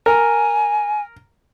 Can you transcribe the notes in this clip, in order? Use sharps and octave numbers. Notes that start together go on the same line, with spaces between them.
A#4 G#5